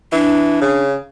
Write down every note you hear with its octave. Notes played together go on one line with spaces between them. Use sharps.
E3 D4
C#3